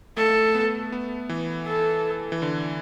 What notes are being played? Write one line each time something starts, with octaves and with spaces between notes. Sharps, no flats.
A3 A4
B3
B3
E3
A4
E3
D3